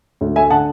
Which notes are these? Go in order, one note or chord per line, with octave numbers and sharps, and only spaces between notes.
D2
A3 E5 G#5
D3 F#5 A5